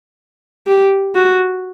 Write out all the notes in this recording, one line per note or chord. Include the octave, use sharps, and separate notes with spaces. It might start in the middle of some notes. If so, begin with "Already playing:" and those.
G4
F#4